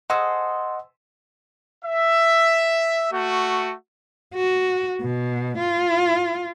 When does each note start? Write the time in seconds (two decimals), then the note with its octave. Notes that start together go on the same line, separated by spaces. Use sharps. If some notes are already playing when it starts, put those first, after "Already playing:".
0.10 G#4 A4 C5 D#5 F#5
1.85 E5
3.13 A3 F#4
4.35 F#4
5.01 B2
5.58 F4